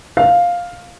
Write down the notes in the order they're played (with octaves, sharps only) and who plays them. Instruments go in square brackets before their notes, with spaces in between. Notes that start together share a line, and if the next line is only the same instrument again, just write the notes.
[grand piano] F5